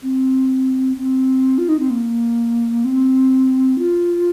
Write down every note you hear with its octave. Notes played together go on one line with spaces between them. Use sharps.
C4
C4
F4
D#4
C4
A#3
C4
F4